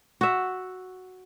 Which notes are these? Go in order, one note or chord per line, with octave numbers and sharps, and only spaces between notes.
F#4 E5